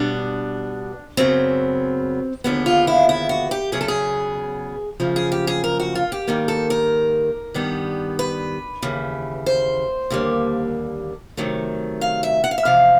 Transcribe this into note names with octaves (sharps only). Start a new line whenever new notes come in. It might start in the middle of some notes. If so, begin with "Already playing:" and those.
Already playing: B2 G3 B3 D4
F#2 C#3 F#3 B3 C4
D#2 D3 F3 G#3 B3
F4
E4
E4
F#4
G4
E2 C#3 F#3 B3 G#4
A4
G#4
F#2 C#3 F3 A#3
G#4
G4
G#4
A#4
F#4
F4
G4
G#2 D#3 G3 A#3
A4
A#4
G2 D#3 G3 B3
B4
D#2 C#3 E3
C5
D#2 D3 G3 A#3
C3 D#3 F#3 A3
F5
E5
F#5
F5
E5
E2 C3 F3 F5